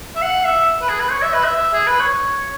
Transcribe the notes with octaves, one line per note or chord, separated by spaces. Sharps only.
E5
F#5
E5
B4
G#4
B4
C#5
E5
B4
E5
E5
G#4
B4
C#5